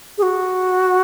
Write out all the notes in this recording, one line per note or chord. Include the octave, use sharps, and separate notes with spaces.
G#4
F#4